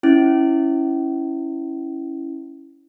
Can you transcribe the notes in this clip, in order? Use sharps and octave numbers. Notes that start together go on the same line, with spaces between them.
C#4 E4